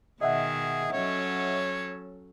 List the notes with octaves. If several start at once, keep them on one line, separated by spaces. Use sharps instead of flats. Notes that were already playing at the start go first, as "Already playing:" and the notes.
B2 D#3 G#4 D#5 E5 F#5
F#3 C#4 A4 C#5